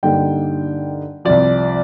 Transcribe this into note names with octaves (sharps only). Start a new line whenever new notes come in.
G2 D3 G3 A#3 D#4 G5
C2 C3 F3 D5